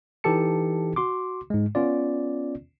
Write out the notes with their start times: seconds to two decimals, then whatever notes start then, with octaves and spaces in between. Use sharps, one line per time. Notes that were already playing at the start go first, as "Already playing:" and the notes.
0.24 E3 D#4 G4 A4 A5 C#7
0.96 F#4 C6 D6
1.50 G#2 G#3
1.75 B3 C#4 F4 D5